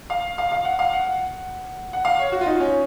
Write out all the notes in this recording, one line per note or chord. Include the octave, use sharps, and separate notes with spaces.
F5
F5
F5
F#5
F5
F#5
F#5
F5
C#5
F#4
F4
D#4
C#4